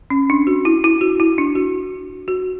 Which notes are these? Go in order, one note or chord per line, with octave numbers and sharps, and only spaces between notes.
C#4
D4
F#4
E4
E4
F#4
E4
D4
F#4
F#4